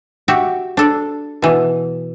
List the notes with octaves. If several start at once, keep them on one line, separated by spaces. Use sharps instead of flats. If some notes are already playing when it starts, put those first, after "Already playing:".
F#4 G4 E5
D4 A4
B2 E3